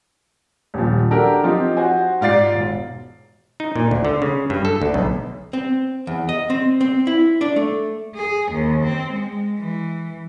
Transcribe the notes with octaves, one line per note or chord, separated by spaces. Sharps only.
D#1 F3
D4 F#4 G4 A4 A#4
F3 C4 D#4 F4 G4
F#4 C5 G#5
G#2 F4 D5 A6 C7
E1
D#4
A#2
D2
D3
C#3
G2
A4
D2
B1
C4
E2
D#5
C4
C4
E4
D4
A3
G#4
D#2
C4
G#3
E3